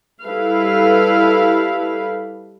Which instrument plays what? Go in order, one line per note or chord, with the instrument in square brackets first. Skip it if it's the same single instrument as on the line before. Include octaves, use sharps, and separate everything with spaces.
[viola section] G3 E4 A4 B4 F5